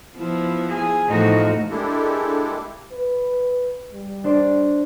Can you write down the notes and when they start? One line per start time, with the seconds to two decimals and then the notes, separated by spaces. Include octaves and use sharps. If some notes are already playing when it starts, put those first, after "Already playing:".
0.17 F3 B3 E4
0.69 G#4
1.08 E2 A2 F3 D#4 F#4
1.70 G#3 A#3 D4 E4 G4 A4
2.92 B4
3.93 G3
4.24 D4 C5 D5